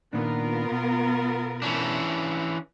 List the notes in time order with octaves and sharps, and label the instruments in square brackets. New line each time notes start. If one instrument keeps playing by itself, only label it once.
[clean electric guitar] A#2 D#3 D4 [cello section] B3 F4 A#4
[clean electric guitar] B2
[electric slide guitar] E3 C#4 D4